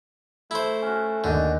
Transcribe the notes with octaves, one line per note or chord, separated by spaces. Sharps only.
A3 E4 C5
C#4 F#4
D#2 D3 F#4 D#5 G5